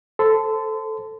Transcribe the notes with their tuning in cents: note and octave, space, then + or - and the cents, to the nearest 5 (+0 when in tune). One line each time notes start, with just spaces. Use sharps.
A4 +0 C5 +0 C6 -35